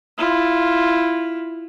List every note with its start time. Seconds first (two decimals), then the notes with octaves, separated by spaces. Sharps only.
0.18 E4 F4